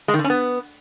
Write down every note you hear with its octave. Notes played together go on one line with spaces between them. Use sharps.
G#3
D#3
D3
C#4
B3